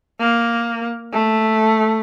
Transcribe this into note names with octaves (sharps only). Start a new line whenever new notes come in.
A#3
A3